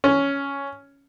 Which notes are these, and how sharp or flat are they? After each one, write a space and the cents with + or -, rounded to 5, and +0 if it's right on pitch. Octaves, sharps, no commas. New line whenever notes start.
C#4 +5